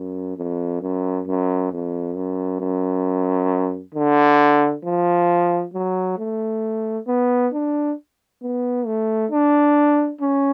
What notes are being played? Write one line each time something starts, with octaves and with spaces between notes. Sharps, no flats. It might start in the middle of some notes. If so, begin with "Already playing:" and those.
Already playing: F#2
F2
F#2
F#2
F2
F#2
F#2
D3
F3
F#3
A3
B3
D4
B3
A3
D4
C#4